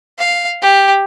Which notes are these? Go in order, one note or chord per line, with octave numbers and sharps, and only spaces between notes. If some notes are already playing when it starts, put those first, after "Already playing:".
F5
G4